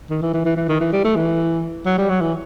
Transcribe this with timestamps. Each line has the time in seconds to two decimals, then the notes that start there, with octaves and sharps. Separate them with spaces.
0.10 D#3
0.22 E3
0.34 E3
0.46 E3
0.57 E3
0.69 D#3
0.81 E3
0.93 G3
1.04 A3
1.16 E3
1.86 F#3
1.98 G3
2.10 F#3
2.21 E3